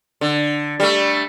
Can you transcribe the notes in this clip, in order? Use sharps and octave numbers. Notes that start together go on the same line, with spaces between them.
D3
G3 A3